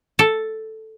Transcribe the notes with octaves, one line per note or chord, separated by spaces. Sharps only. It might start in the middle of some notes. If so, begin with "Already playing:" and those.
A4